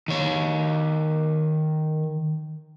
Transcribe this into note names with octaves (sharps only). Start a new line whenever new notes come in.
D#3 C#5